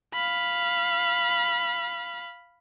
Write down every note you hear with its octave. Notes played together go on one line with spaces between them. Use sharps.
F5 B5